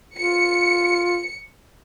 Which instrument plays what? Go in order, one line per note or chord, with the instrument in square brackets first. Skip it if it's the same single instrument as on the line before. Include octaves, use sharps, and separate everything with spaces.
[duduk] F4 [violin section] C#7